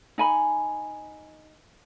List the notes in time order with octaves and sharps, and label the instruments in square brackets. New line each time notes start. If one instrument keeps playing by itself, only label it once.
[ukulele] D#4 G#5 B5